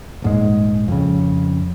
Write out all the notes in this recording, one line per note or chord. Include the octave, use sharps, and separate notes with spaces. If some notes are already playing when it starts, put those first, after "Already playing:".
D#1 G#2 G#3
F2 C#3